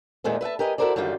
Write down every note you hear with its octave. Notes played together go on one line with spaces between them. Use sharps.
E2 A#2 D#3 G#3 A3 C4
B4 E5 F#5 A5
G4 A#4 B4 D#5 G#5
E4 F#4 A4 A#4 C5 D5
F#2 D3 D#3 G3 F4 G5